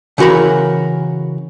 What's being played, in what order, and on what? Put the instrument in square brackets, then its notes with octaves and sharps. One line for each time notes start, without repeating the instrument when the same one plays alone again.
[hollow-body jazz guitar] C#3 E3 F#4 A#4 B5